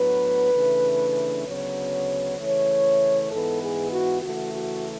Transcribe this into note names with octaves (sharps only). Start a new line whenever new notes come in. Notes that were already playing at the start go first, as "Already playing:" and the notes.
Already playing: A2 F#3 B3 D4 B4
C#3 E3 A3 D4
D2 C#3 F#3 B3 C#5
C#3 E3 A3 C#5
G#2 E3 B3 A4
G#4
F#4
C#3 E3 A3 F#4
F#4